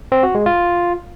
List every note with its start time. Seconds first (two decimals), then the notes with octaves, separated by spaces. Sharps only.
0.12 C4
0.23 F#4
0.35 G#3
0.46 F4